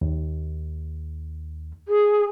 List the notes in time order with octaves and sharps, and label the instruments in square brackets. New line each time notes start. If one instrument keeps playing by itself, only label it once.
[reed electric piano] D#2
[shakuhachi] G#4